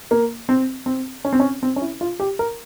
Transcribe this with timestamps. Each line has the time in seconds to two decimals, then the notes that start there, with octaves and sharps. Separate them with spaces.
0.11 A#3
0.49 C4
0.86 C4
1.25 C#4
1.33 C4
1.40 C#4
1.63 C4
1.76 C#4
1.82 E4
2.01 F4
2.20 G4
2.39 A#4